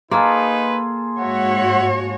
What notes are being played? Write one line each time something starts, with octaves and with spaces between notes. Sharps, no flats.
A#3 D#4 F4 G#4 A4 B4
G#2 F#4 C#5 E5 F#5